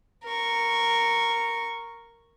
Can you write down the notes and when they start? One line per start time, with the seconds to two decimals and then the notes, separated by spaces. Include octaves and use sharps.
0.24 A#4 C#6